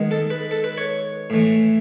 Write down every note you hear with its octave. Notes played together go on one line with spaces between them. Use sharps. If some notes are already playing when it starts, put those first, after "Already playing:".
Already playing: D#3 G#3 B3
A4
B4
A4
B4
C#5
A2 E3 A3